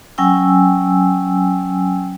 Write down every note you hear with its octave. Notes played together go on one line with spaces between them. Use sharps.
F#3 C#4 G5 G#5 E6